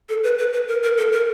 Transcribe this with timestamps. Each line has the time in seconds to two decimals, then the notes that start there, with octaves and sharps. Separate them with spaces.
0.09 A4
0.24 B4
0.38 B4
0.53 B4
0.68 A#4
0.83 A#4
0.98 A4
1.12 A#4